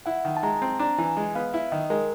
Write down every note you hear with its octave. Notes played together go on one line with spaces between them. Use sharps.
E4 F#5
D#3
A5
G#3 A#5
C4
D4 A#5
E3 G#5
G#3
B3 F5
E4
D#3 D#5
G#3 A#4